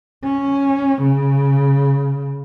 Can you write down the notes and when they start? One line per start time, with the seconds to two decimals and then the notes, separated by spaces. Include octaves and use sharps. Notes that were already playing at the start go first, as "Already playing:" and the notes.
0.24 C#4
1.02 C#3